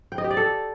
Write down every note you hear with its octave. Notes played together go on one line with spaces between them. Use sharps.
G5
D#5
G4
D5
A4